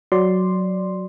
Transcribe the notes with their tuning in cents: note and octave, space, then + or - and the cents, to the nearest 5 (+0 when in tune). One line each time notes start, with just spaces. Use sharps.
F#3 +0 D5 +0 C6 +0